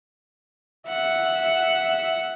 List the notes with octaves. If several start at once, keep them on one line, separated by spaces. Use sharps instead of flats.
E5 F#5